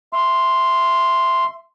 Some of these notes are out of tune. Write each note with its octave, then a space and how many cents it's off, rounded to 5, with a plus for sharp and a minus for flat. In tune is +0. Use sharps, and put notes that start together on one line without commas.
E5 +15 C6 +0